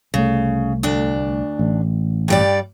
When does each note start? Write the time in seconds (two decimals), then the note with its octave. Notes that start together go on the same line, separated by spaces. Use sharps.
0.14 C2 C#3 A3
0.83 D2 D4
1.59 A1
2.28 G2 G3 D5